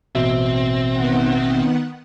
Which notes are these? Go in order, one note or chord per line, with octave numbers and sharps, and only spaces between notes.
A1 B2 C4 E5
D#3 B3 F#5